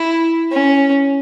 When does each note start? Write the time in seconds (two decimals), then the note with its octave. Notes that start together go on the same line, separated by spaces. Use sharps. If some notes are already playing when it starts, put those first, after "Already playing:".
Already playing: E4
0.52 C#4